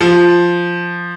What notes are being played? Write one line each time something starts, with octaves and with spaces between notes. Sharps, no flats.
F3